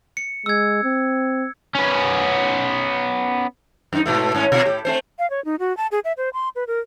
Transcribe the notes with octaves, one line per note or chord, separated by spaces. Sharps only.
C#7
G#3 E6 G#6
C4
B3 C#4
F#2 D#4
G#2 B2 A3
G#2 C#4
B2 F4
A2 G4
A3 C4 C5
F5
C#5
D#4
F#4
A5
G#4
E5
C5
C6
B4
A#4